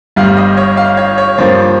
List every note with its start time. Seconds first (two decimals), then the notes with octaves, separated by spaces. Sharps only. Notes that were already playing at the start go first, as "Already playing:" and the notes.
0.16 G1 G2 G3 F5
0.37 D#5
0.57 C#5
0.77 F5
0.97 C#5
1.18 C#5
1.38 G2 F3 A#3 C5